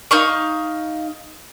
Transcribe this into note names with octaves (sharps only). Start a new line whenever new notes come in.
D#4 F5 C#6